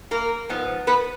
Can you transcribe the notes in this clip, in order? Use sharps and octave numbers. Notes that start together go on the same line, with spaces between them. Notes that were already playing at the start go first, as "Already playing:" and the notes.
A#3 A#4
G#2 F3 B3
B3 B4